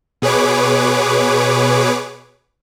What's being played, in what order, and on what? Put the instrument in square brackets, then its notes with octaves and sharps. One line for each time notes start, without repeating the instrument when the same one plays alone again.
[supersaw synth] B2 G#4 B4 C#5 D6